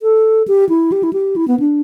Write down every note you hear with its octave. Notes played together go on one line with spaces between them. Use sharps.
A4
G4
E4
G4
E4
G4
E4
B3
D4